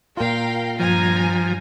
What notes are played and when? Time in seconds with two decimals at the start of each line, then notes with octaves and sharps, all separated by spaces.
0.17 A#2 F4 A#4 F5 G5
0.80 G2 F3 G#5 A#5